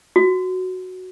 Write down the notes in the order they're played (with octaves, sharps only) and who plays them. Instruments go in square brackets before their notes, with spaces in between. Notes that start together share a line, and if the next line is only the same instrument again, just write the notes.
[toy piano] F#4